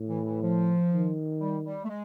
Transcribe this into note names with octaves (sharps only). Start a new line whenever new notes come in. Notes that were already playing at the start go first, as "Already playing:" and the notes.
Already playing: A2
E3
E3
F3
D#3
G3
G3
A3
G#3